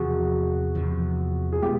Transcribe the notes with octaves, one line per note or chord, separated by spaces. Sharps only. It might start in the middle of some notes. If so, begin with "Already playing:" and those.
Already playing: E2 C3 F3 F#4 G#4
E2 C3 F3
G#4
B2 G#3 B3 F4 G4